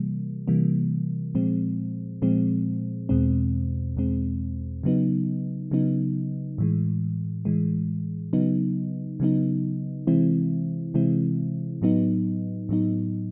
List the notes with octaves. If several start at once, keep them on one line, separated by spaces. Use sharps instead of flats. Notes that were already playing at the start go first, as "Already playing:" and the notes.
Already playing: C3 E3 G3 A#3
C3 E3 G3 A#3
A#2 F3 G#3 C4
A#2 F3 G#3 C4
E2 B2 G#3 C4
E2 B2 G#3 C4
C#3 F#3 B3 D#4
C#3 F#3 B3 D#4
A2 E3 G#3
A2 E3 G#3
C#3 F#3 B3 D#4
C#3 F#3 B3 D#4
C3 E3 G#3 C4 E4
C3 E3 G#3 C4 E4
A2 F#3 B3 D#4
A2 F#3 B3 D#4